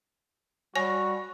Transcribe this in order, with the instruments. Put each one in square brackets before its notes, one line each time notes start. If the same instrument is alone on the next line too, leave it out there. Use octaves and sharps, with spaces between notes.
[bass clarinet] G3 [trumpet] F#4 [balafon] C#5 G#5